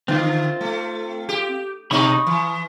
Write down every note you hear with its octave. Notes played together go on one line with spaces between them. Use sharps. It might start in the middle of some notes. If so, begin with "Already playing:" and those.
D3 C4 F4
A3
G4
B2 D#4 B5 C#6 D#6
E3